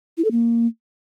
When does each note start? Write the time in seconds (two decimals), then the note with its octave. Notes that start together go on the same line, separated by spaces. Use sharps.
0.18 E4
0.24 A4
0.31 A#3